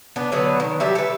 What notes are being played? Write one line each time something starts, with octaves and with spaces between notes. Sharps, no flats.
B3 D4
D3 F#3 B3 F#4
D#3
F#3 G3 G4 E5
A4 B4